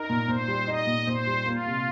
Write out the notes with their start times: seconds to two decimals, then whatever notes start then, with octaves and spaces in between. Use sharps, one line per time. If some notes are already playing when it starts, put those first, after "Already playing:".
Already playing: D#4 A#4
0.09 A#2
0.28 A#2 C5
0.48 G3
0.67 D#4 D#5
0.87 A#2
1.07 A#2 C5
1.27 G3
1.46 A#3 F4
1.66 C3